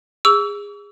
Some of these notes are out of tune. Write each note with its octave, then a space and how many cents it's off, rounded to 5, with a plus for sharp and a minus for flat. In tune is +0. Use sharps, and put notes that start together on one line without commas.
G#4 -25 C#6 +45 E6 +0